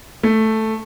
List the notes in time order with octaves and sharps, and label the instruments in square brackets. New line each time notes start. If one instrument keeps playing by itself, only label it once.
[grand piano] A3